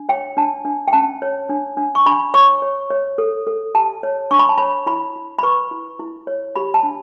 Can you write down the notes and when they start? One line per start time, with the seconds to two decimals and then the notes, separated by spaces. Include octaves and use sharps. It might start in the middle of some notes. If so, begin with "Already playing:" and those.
Already playing: D4
0.09 C#5 G5
0.37 D4 A5
0.65 D4
0.88 G5
0.93 C#4 A5
1.22 C#5
1.49 D4
1.77 D4
1.95 C#6
2.06 D4 B5
2.34 C#5 C#6
2.62 C#5
2.90 C#5
3.18 A4
3.47 A4
3.74 G4 A5
4.03 C#5
4.31 D4 C#6
4.39 B5
4.49 A5
4.58 C#5 B5
4.86 E4 B5
5.16 E4
5.39 B5
5.43 B4 C#6
5.71 E4
5.99 E4
6.27 C#5
6.56 G4 B5
6.74 A5
6.83 D4